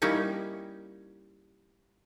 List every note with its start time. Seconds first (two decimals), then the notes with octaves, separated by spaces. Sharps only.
0.02 G3 A#3 C#4 D#4 E4